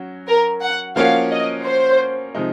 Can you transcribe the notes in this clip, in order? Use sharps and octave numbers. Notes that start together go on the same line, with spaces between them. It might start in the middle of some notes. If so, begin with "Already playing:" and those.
Already playing: F#3 C#4 F#4
A#4
F#5
F3 A#3 C#4 F#4 C#5 F5
D#5
C5
C3 F3 G#3 D#4